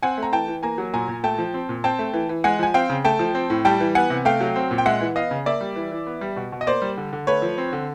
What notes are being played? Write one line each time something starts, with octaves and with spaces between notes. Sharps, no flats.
C4 F#5 G#5
A3 A#5
E3 G5 A5
E3
A#3 G#5 A#5
F#3
A#2 G#5 A#5
A#2
A3 G5 A5
F3
C4
A#2
C4 G5 A5
A3
E3
E3
G#3 F#5 G#5
F3 G#5
C4 F5 G5
C#3
A3 G5 A5
F3
C4
A2
G3 G5 A5
E3
B3 F#5 G#5
C3
A3 F5 G5
F#3
C4
A#2
G5
G#3 E5 F#5
E3
B3 D#5 F5
C#3
A#3 D5 E5
G3
E3
E3
B3
G3
B2
B2
D#5
A#3 C5 D5
G3
D3
D3
A3 B4 C#5
F3
C4
D3